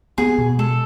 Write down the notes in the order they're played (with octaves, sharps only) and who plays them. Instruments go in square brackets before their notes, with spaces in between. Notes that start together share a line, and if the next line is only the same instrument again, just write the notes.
[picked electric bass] B3 [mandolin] G#4
[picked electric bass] B2
[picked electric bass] G#3 [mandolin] A4